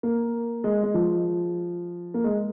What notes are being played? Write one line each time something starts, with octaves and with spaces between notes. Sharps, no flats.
A#3
G#3
G#3
F3
A#3
G#3